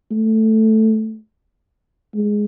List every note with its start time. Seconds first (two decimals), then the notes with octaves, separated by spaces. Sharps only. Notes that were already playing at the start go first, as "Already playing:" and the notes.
0.11 A3
2.14 G#3